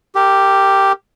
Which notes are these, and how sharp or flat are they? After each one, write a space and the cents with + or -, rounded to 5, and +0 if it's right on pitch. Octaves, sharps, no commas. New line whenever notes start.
G4 +0 A#4 -30